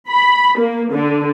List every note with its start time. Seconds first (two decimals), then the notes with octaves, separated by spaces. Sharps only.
0.10 B5
0.58 A#3
0.93 D3